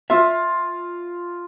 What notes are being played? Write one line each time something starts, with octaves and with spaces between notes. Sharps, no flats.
F4 E5